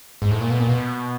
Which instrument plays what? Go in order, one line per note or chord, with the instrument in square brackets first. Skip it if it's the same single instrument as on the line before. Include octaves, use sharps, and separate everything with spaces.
[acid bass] G#2
A2
A#2
B2
A#2
B2